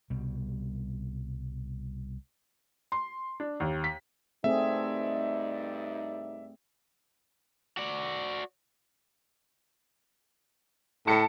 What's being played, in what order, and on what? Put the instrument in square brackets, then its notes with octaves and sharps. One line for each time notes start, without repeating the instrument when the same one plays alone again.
[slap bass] C2 B2 G3
[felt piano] C6
D4
D#2
B6
[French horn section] G2 D#4 D5 [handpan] A3 C4 G#4 [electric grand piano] E5
[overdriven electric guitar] F#4 D5
[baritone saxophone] A2 [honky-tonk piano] A5 C#7